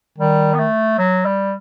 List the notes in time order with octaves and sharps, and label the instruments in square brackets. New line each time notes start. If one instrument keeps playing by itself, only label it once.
[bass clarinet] D#3 [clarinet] G3
[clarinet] B3
A3
F#3
G3